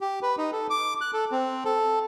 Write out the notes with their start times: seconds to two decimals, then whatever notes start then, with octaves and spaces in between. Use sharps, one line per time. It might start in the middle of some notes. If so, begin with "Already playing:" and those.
0.01 G4
0.22 B4
0.38 D#4
0.53 A4
0.70 D6
1.01 F#6
1.13 A4
1.31 C4
1.65 A4